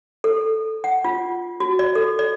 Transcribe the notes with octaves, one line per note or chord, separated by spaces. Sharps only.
A4
F#5
F4
F#4
D5
A4
D5